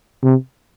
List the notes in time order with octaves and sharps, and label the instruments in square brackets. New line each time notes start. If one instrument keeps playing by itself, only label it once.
[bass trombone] C3